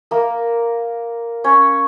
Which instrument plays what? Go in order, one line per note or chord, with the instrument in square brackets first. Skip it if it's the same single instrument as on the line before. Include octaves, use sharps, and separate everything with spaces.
[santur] A#3 A#4
C#4 C#5